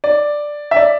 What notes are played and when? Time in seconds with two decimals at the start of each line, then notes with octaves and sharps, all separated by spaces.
0.04 D5
0.71 E5
0.76 D5